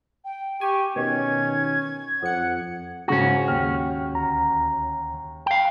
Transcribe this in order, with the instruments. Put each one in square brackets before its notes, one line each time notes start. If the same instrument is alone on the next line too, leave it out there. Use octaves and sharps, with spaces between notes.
[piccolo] G5
[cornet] G4 [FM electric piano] G#5 [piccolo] C#6
[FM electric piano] B2 D#3 [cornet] C#4 [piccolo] G#6
[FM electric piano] F2 C#7 [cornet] F#5
[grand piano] G#2 C#3 A#6 [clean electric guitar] C#4 F#4
[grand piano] D#2 G5 F6
[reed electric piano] D2 A#5
[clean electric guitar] F5 G5